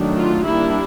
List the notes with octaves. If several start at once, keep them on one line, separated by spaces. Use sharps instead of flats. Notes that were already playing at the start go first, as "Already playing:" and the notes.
Already playing: D#3 F#3 A3 D4
F4
G3 A#3 D4 E4